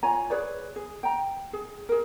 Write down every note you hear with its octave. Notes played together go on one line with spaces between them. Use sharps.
F4 C#5 G#5 A#5
G#4 B4 C#5 D5
G#4
G5 A#5
G#4
G#4 A#4